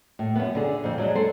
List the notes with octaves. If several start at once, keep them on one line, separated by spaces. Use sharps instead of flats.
A2
F#2 B3
D3 G#4
F2 C4
F#3 G#3 D4
A4 C5